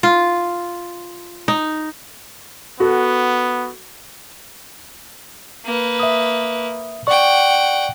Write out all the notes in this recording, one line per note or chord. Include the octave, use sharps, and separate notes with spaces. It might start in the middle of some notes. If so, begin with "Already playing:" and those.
F4
D#4
B3 F#4 A4
A#3 B4
E5 D#6
D5 F#5 G5 C#6